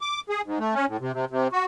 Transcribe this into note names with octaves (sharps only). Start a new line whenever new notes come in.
D6
G#4
G#2
A3
C#4
A2
C3
C3
C3
F#4